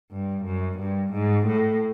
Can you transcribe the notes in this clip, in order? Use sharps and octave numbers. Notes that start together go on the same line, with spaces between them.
G2
F#2
G2
G#2
A2